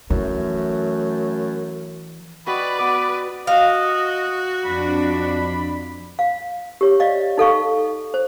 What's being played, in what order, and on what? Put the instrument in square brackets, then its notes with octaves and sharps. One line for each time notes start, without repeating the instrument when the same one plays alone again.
[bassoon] F#2 [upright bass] E3 [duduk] A3
[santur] F#4 D#5 G5 [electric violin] B4 D5 [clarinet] B5
[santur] B3 [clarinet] D6
[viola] F#4 [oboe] D#5 [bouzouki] F5
[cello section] F2 D4 [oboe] B5
[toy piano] F5
G4 C#5
D5 D#5 F5
D#4 A4 F5 C#6
C5